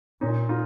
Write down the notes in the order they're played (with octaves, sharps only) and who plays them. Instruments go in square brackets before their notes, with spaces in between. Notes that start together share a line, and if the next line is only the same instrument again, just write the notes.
[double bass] A#2 [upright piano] C#4 D#4
[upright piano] D#4 F4